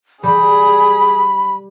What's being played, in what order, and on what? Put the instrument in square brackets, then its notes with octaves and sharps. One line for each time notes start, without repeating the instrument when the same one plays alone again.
[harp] G3 [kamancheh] G#4 [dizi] B5